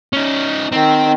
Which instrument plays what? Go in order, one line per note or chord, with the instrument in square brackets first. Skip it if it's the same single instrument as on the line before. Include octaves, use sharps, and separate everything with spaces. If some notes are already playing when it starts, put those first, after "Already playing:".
[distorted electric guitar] C#4 D#4
[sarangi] D#3 [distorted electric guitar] C4